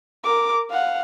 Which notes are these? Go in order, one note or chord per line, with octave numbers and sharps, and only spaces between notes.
A#4 D6
F5 F#5